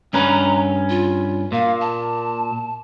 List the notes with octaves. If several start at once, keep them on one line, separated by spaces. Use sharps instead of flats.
G2 C#4 B4 A#5
F4
A#2 F5
A5